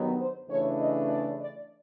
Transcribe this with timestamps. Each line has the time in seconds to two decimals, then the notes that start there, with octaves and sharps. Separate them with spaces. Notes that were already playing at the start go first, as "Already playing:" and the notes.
Already playing: G2 D#3 F#3 B3 D#4
0.20 C5
0.49 C#3 E3 A3 D4 C#5
0.80 D#5
1.10 D5
1.39 D5